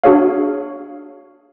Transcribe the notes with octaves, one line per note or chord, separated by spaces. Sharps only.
D4 F#4 G#4 C#5 F5